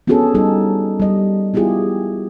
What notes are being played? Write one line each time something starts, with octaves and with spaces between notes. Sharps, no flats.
B3 C#4 D4 F#4 G#4 A4
G3 D#4 A4
G3 D#5
B3 E4 F4 G4 G#4